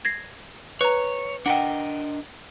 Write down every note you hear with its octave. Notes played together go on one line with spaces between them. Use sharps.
G#6 A#6 C7
B4 C#5 A#5
D4 A#4 D#5 F#5 G5